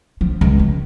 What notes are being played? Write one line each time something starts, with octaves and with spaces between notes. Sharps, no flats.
F3
C#2
C#4